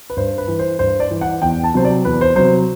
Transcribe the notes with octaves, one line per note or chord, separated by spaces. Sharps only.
B4
G2 C5
B4
E3
C5
G2 C5
D5
E3
F#5
E2 G5
A5
C3 F#3 C5
D5
E2 B4
C5
C3 F#3 C5